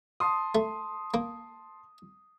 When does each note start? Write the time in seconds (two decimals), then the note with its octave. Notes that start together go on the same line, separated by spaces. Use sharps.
0.20 A5 C6 D#6
0.55 A3
1.14 A#3